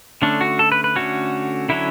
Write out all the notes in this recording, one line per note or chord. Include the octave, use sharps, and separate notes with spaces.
D3 A3 C#4 D4
F#4
A4
B4
B4
D3 A3 C#4 F#4
D3 F#3 C#4 E4